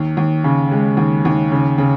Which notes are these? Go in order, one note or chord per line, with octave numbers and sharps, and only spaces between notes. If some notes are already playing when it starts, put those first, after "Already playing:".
Already playing: D#2
D#2
C#3
G#3
D#2
D#2
C#3
C#3